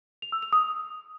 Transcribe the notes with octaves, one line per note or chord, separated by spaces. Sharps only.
F7
E6
F7
D#6